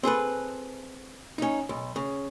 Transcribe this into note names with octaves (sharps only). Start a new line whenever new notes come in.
C4 G#4 A4 B4
C#4 D#4
B1
C#3